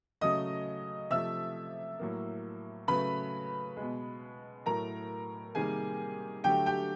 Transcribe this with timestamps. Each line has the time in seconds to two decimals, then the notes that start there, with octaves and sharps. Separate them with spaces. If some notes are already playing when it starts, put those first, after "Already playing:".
0.21 C#3 F#3 A3 D#5 D#6
1.10 C3 F3 A3 E5 E6
1.99 A2 F#3 A#3
2.88 C#3 F#3 A3 B4 B5
3.77 B2 G#3
4.66 A2 F#3 A3 A#4 A#5
5.55 C3 D#3 G3 A#3 G#4 G#5
6.44 D3 F#3 A3 G4 G5
6.66 G4 G5